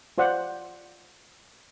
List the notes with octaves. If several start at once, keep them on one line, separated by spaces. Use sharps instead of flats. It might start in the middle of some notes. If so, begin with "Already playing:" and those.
F4 C5 D5 F#5